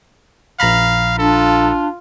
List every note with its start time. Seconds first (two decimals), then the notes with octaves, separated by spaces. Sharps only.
0.60 A#1 F5 A#5 B5
1.19 D4 F4 A4